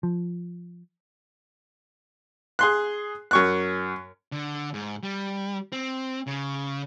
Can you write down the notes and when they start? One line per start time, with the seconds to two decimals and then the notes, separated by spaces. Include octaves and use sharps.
0.03 F3
2.59 G#4 C6 F#6
3.31 F#2 C#6 F#6
4.32 D3
4.74 G#2
5.03 G3
5.72 C4
6.27 C#3